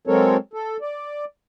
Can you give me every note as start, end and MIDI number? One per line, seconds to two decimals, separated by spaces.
0.07 0.37 54
0.07 0.37 56
0.07 0.37 60
0.07 0.37 69
0.07 0.37 70
0.07 0.37 73
0.53 0.77 69
0.82 1.25 74